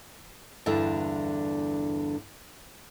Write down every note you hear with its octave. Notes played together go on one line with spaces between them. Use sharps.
E2 G2 D3 E5